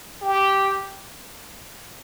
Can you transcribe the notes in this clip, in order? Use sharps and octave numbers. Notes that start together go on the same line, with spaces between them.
G4